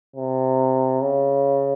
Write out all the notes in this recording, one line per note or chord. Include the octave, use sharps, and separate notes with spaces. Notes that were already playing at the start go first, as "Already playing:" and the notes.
C3
C#3